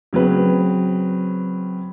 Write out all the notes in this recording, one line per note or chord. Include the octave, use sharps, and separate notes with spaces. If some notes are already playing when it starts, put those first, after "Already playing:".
C#3 F#3 C4 B4